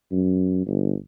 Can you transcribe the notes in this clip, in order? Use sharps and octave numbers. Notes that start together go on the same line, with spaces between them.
F#2
G1